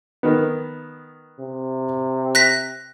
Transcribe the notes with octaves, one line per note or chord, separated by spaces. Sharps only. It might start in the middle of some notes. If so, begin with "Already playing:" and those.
D#3 B3
C3
F#6 A#6 B6